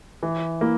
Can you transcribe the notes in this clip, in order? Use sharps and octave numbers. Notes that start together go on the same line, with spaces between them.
E3
A#3 E4